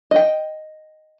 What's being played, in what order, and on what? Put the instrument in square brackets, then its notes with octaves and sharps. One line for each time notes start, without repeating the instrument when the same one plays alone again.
[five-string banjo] D#5 G5